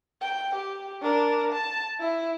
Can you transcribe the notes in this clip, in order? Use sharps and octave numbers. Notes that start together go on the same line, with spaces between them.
G5
G4
D4 A#4
A5
E4